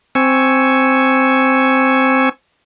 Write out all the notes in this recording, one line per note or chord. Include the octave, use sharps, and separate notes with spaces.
C4 G#5 C#6 E6